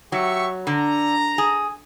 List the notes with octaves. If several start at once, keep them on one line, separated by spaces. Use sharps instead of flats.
F#3 G4 E5 C#6
D3 A#5
G#4